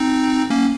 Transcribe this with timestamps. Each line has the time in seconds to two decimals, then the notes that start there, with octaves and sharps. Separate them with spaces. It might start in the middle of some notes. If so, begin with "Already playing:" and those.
Already playing: C4 D#4
0.50 A#3 C#4